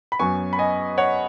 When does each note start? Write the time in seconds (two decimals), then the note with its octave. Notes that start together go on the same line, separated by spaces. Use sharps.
0.12 B5
0.19 F#2 F#3 B3 G#5 C#6
0.53 B5
0.59 D#5 G#5
0.98 C#5 F#5